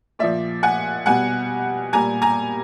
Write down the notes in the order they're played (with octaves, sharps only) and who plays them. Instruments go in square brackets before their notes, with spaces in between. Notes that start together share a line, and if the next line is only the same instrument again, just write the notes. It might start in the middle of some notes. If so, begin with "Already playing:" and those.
[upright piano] A#2 F3 D5 E5
F#5 G#5
B2 G3 F#5 G#5
A#2 G3 G#5 A#5
G#5 A#5